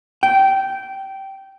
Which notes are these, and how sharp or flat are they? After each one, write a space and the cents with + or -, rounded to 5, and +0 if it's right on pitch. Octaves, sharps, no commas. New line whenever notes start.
G5 -15